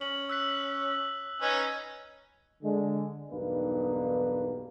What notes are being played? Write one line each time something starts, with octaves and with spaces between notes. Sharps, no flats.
C#4 F#7
E6 F#6 B6
C#4 D#4 B4
D3 G#3
B1 E2 G2 A#3 D#4 B4